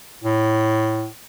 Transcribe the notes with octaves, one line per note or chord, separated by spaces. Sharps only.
A2